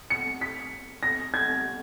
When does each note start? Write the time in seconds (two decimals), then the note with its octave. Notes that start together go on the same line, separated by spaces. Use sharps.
0.10 C#7
0.41 B6
1.03 A#6
1.34 G#6